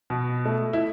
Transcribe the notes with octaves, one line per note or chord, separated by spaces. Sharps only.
B2
A3
E4